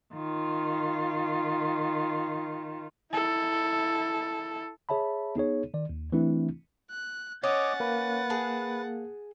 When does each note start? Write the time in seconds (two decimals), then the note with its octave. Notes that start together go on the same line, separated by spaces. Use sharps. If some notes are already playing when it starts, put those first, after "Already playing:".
0.13 D#3 F4
3.12 E4 A4
4.89 G#4 C#5 E5 A5 B5
5.36 B3 D#4 G#4 C#5
5.74 D#3 D5
5.89 D#2
6.12 E3 A3 C4 D4 E4
6.91 F#6
7.44 C#4 C#5 D#5 F#5 D6 A6
7.80 A#3 B4
8.30 G#4 A5